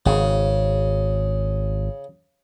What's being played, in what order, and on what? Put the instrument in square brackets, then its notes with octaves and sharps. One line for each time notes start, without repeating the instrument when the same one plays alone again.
[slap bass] G#1 [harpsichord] C#3